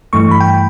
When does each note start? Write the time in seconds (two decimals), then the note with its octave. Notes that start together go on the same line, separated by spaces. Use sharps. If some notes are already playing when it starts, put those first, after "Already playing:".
0.13 G2 E3 A3 C#6
0.31 B5
0.40 G5